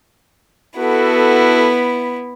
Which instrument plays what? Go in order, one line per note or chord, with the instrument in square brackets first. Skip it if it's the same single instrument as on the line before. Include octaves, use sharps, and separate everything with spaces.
[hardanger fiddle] B3 E4 [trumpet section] F#4 A4